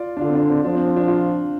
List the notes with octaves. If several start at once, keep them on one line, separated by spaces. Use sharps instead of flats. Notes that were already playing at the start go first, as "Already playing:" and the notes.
Already playing: F4 D5
D4
D3 F4
C4
D4
C4
F3 D4
C4
C4
D4
F4